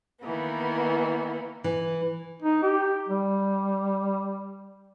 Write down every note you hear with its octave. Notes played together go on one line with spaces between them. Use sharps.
D#3 E3 A#3 B3
E3
D#4
G4
G3